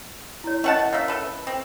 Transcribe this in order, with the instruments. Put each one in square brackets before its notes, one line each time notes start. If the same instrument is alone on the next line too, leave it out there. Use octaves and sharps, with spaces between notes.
[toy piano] E4 C#5
[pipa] A3 F#5 A5 [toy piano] C#4 A#4 D#5
[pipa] A#3 E5 [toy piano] C#5
[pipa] A4 B4
C4